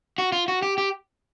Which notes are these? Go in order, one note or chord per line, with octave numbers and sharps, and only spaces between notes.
F#4
F4
F#4
G4
G4